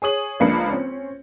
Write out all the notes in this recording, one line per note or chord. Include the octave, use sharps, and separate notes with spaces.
G#4 C#5 D#6 F#7
C#2 F3 A#3 D4 B5 C#7
C4 C#4